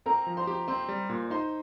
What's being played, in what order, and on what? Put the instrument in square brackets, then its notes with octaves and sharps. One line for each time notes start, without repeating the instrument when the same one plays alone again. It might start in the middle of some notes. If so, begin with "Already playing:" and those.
[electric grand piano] C4 [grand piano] A#4 A#5
[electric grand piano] F3
[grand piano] C5 C6
[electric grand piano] G4
[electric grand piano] C4 [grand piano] C5 C6
[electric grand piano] G3
A#2
[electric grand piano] D#4 [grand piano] C5 C6